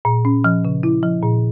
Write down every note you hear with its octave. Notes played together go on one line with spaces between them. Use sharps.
A#2
C#4
F3
C#3
E4
F3
A#2